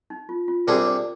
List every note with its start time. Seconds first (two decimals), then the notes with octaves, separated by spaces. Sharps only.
0.10 D#4
0.29 F4
0.48 F4
0.67 C3 G3 D4 G#4 A#4
0.86 D5